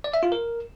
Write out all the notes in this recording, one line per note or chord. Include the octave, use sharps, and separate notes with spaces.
D5
E5
F4
A#4